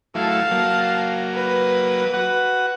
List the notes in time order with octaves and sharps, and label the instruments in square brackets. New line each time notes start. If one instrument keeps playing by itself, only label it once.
[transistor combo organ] F#3 A3 E4 [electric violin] F5 A5
[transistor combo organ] F#3 A#3
[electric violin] B4
[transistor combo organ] F#4 F#5